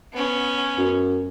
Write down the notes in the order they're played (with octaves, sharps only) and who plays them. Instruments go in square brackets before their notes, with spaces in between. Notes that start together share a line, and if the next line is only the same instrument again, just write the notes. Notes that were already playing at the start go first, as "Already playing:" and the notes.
[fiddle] B3 C#4
[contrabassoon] F#2